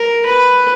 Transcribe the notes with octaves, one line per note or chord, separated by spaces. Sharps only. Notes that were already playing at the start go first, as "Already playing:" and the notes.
Already playing: A#4
B4